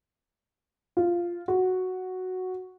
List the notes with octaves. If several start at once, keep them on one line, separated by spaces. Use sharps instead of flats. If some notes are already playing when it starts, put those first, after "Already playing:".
F4
F#4